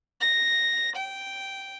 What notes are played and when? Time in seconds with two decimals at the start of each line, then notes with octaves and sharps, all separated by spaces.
0.21 A#6
0.97 G5